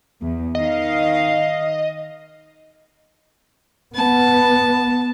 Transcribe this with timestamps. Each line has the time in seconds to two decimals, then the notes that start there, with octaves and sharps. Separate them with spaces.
0.21 E2
0.55 D#3 D#5 F5
3.95 B3 A5